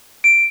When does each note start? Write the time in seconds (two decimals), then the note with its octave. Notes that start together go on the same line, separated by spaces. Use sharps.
0.24 D7